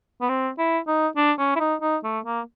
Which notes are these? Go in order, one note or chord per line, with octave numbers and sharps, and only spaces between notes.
B3
C4
E4
D#4
D4
C#4
E4
D#4
D#4
A3
A#3